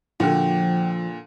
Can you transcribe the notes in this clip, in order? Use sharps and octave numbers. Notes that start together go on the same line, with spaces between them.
A#2 D3 F3 F#4 G4